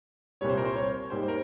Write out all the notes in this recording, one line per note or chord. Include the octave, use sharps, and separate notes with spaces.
C2 A#2 G3 C#5
C5
A#4
C5
C#5
G#2 G3 A#3 C5
C5
A#4